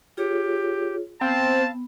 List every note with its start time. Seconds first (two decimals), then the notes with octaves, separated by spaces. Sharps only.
0.17 F4 G4 G#4 C#5
1.21 B3 C4 F5 A5